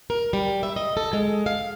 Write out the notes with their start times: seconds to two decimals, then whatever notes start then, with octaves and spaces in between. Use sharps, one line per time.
0.10 A#4
0.33 G3
0.63 E5
0.76 D#5
0.97 A4
1.13 G#3
1.46 F5